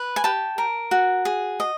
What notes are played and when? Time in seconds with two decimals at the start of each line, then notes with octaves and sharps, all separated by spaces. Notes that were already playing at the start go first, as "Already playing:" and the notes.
Already playing: B4
0.16 G#5
0.24 G4 A5
0.58 A#4
0.91 F#4
1.25 G#4
1.60 D#5